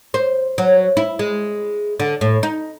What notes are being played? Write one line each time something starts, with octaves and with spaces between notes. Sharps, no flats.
C5
F#3
E4
G#3
D3
A2
D#4